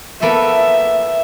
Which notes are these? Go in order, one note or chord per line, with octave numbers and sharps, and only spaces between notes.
A#3 B3 A4 E5